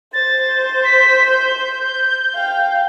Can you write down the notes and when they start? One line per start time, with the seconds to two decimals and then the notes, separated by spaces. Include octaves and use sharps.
0.13 C5 A6
0.84 B6
1.30 G6
2.35 F5 G5